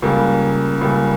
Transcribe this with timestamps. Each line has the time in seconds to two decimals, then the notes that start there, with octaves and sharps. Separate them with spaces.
0.02 C#2 C#3 G3 A#3
0.81 C#2 C#3 G3 A#3